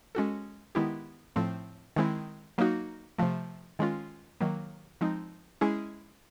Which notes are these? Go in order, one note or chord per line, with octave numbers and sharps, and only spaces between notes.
G#3 C#4 F#4 A4
D#3 G#3 B3 E4 G4
A2 F3 A3 C4
D#3 G#3 C4 E4
F#3 A#3 D#4 F#4
C3 F3 A3
D#3 G#3 C#4 F4
D#3 F#3 A#3
F3 G#3 C4 D#4
G#3 C#4 E4 G#4